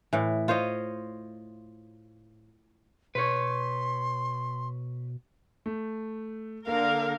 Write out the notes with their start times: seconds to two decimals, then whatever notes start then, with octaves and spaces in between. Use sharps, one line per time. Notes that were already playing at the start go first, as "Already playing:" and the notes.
0.13 A2 E3
0.48 F4 C5 C#5 D#5
3.15 B2 B4 C#5 C6
5.66 A3
6.67 D3 A#3 A#4 F5